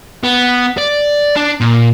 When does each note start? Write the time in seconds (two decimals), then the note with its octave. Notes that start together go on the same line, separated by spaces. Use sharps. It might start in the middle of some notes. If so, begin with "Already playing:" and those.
0.23 B3
0.78 D5
1.36 D4
1.60 A#2